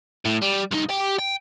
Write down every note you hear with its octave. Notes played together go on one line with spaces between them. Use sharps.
A2
G3
C2 D#4
G4 G5
G5